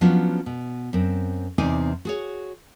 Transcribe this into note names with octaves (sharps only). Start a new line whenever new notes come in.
F3 F#3 B3 C#4 D4
B2
F#2 C4
E2 C3 C4 D#4 D5 G#5
F#4 G#4 C#5